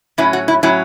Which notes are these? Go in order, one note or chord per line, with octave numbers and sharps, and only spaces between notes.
A2 F#3 C#4 E4
F#4
E4
A2 F#3 C#4 E4